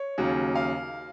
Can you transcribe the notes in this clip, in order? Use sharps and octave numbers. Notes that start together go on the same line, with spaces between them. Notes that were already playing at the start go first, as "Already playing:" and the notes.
Already playing: C#5
D#2 C#3 F#3
F5